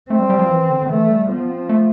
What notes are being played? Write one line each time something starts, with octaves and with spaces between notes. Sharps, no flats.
A3 C4
G3
G3
F3
E3
D3
E3 A3
G3
F3 B3
C4
A3